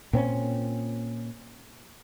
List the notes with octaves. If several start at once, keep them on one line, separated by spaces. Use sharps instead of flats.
A#2 C4 C#4